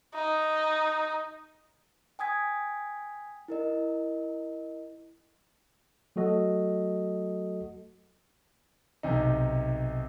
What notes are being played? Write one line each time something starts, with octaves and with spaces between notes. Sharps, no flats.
D#4
G5 G#5 D#6 G#6 B6
E4 A#4 D#5
F#3 A3 F#4 A4 D#5
B1 C3 D#4